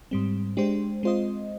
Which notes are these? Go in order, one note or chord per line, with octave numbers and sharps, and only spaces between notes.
G#2 G3 C4
G#3 D4 G4 C5
G#3 C4 F4 C5 D#5